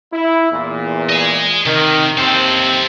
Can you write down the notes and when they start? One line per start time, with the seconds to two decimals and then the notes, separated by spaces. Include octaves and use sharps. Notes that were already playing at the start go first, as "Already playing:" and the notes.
0.13 E4
0.52 E2 A#2
1.09 D#5 G#5
1.66 C3 D#3
2.18 D#2 C3 C4 A4 C5